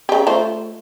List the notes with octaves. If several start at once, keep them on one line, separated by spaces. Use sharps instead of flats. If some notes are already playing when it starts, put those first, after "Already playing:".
C#3 G4
A3 F4 C5